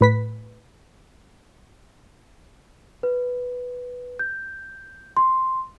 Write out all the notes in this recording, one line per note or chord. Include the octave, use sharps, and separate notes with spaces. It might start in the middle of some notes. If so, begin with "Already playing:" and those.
A2 B4 B6
B4
G6
C6